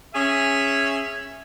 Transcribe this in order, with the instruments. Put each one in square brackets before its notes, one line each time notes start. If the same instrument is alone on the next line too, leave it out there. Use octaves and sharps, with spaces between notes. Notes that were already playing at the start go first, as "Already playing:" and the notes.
[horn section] C#4 G#4 E5